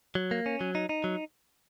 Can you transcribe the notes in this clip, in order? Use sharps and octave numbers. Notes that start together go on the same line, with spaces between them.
F#3
A#3
C#4
F#3
D#4
D#4
F#3